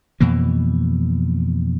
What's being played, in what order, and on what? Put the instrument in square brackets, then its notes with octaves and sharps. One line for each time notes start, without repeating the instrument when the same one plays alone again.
[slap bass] F2 B2 E3 A#3